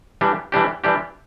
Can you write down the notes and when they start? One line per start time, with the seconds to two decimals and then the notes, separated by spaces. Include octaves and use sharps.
0.21 E3 G3 D4 G4
0.52 E3 G3 D4 G4
0.84 E3 G3 D4 G4